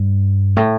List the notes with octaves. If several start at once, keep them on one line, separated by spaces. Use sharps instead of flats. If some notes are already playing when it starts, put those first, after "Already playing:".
Already playing: G2
A2